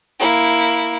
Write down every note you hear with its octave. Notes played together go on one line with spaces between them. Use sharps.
A#3 E4